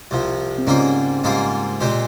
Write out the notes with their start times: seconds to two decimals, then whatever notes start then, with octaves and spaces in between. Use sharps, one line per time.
0.11 C2 C3 F3
0.58 C4
0.67 G#2 C#3 G3 A#3 C#4 F4 G#4
1.24 G#2 G3 A#3 F4 G#4
1.81 A#2 G#3 C4 G4